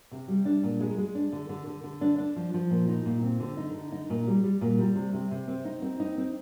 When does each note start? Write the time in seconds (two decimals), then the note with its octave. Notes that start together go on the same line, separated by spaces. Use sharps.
0.11 C3
0.28 G3
0.45 D4
0.63 A#2
0.80 G#3
0.98 G#3
1.15 D4
1.33 D3
1.49 D3
1.67 D3
1.84 D3
2.01 D4
2.18 D4
2.36 F3
2.54 F3
2.70 A#2
2.88 D#4
3.06 A#2
3.22 C4
3.40 D3
3.57 D#4
3.75 D3
3.92 D#4
4.10 A#2
4.27 G3
4.44 G3
4.61 A#2
4.79 G3
4.95 C3
5.13 C3
5.31 C3
5.48 C4
5.65 D#4
5.82 C4
6.00 D#4
6.18 C4